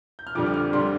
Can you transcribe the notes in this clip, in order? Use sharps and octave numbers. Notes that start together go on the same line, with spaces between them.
G6
F6
F2 D3 G3 D4 D6
D6
F6
D3 G3 D4 C6